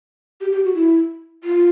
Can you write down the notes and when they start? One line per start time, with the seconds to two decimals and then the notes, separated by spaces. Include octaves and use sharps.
0.41 G4
0.52 G4
0.64 F#4
0.75 E4
1.44 F4